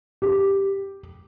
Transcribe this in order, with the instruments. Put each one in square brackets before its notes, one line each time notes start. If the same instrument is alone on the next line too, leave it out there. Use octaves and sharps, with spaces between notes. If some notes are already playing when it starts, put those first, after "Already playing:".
[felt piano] G4